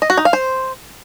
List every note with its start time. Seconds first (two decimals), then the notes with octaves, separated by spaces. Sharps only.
0.02 D#5
0.10 F#4
0.17 D#4
0.25 F5
0.33 C5